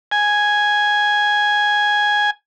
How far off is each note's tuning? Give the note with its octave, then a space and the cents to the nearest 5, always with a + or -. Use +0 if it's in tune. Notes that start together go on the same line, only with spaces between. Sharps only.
G#5 +0